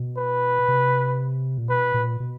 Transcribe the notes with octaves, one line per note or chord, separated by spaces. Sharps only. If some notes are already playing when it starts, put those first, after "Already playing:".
Already playing: B2
B4
C3
A#2
B2 B4
A#2
B2